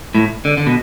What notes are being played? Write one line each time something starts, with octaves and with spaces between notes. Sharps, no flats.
A2
D3
D3
B2